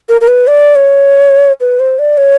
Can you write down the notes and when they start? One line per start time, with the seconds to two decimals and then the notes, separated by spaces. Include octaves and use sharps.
0.09 A#4
0.21 A#4
0.28 B4
0.47 D5
0.76 C#5
1.61 B4
1.80 C5
1.99 D5
2.17 C#5